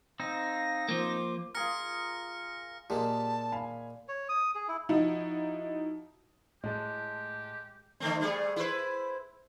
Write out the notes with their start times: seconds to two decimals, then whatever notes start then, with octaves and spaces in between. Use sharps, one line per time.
0.20 C4 D#4 F5 A#6
0.89 F3 A#3 C5 D6
1.55 F4 G#4 A#4 F6 A#6 C#7
2.90 A#2 G#3 G4 G#4 A5
3.52 F5 G#5 B5
4.08 C#5
4.29 D#6
4.55 G#4
4.68 E4
4.89 F3 D#4 E4 F#4
6.64 A2 G#3 G4 A5
8.00 D3 A3 C4
8.20 G3 A3 G#4
8.56 E4 B4 C5